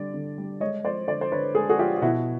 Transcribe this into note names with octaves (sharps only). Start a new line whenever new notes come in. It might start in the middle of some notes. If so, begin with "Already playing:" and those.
Already playing: D3 G3 D5
D3
G3
G#3 C#5 D#5
F3 C5 D5
D3 C5 D5
C5
D3 B4 C#5
G#3 G#4
A4
F#4 G#4
F3 F4 G4
G4
B2 E4 F#4